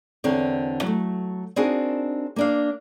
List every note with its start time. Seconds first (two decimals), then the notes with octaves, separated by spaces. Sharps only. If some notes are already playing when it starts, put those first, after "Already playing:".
0.24 E2 D3 C4 A#4 C#5
0.82 F#3 A3
1.56 C4 D4 D#4 F#4 G#4 A#4
2.36 A#3 D4 F5